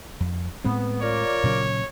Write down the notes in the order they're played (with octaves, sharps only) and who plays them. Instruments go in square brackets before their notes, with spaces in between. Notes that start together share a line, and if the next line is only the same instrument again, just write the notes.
[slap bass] F2
[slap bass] A2 G#3 C4 [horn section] B3
[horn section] F4 A#4 D5 [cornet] C#5
[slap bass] A#2 C#3 F#3